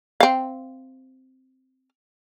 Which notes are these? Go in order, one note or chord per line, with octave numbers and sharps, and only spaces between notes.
C4 F5